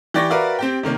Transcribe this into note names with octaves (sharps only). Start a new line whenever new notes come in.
E3 G4 D5 C#6 A6 A#6
F#4 A#4 B4 D5 E5 F5
C4 G4 G5
C3 D#3 A#3 C#4